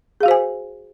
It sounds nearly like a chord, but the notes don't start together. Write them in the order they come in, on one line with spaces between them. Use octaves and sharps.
G#4 F5 F#4 C5 G#5